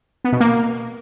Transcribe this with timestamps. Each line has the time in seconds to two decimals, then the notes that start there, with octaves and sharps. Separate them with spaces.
0.24 B3
0.32 B2
0.40 A#3